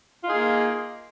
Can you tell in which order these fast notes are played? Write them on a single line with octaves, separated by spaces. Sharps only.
F4 D#4 G#4 A#3